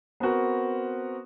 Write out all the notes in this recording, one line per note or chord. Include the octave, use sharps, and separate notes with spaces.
B3 C4 F#4 A#4